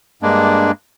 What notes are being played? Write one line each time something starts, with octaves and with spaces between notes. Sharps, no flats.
G2 G#3 A#3 D4